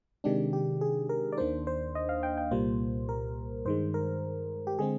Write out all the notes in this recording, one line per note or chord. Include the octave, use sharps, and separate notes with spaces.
C3 D#3 G#3 D4 G4
G4
G#4
A#4
D5
D#2 D#3 A#3 D4 C5
C5
D#5
F5
G5
G5
C2 A#2 G3 A#3 C5
A#4
G2 D#3 G#3 C5
A#4
G4
D3 G#3 C4 G#4